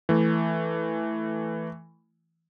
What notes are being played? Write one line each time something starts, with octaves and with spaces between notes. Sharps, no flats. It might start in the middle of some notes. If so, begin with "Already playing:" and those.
E3 A3